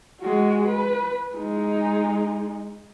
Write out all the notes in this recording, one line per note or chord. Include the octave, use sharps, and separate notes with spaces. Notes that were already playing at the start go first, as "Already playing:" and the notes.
G#3 F#4
B4
G#3 D#4